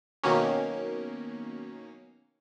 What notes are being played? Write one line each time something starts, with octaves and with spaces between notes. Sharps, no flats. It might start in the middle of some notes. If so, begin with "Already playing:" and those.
B2 D#3 F#3 A#3 C#4